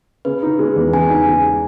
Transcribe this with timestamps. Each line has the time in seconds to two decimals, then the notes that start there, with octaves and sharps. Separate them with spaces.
0.25 C#3 B4
0.42 D#4
0.59 G#3
0.76 E2
0.93 C#3 G#5
1.09 D#4
1.27 G#3